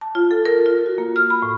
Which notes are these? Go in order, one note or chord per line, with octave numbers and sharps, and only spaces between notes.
A5
F4
A4
A#4
F4
F#4
A#3
F6
B5
A2